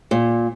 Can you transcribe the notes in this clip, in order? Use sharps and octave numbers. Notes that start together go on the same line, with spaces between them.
A#2